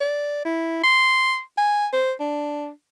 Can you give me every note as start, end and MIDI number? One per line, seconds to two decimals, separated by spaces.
0.01 0.42 74
0.45 0.80 64
0.84 1.40 84
1.58 1.88 80
1.93 2.13 72
2.20 2.69 62